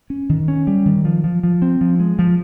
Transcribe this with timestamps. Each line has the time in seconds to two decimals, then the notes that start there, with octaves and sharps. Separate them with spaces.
0.10 C#4
0.29 D#3
0.48 C#4
0.67 G3
0.86 D#3
1.05 F3
1.24 F3
1.43 F3
1.62 C4
1.81 F3
2.00 G#3
2.19 F3